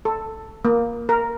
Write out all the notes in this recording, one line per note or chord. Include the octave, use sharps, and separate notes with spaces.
A4
A#3
A#4